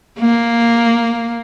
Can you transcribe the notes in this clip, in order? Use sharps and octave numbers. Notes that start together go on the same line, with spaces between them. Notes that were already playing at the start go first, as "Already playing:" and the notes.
A#3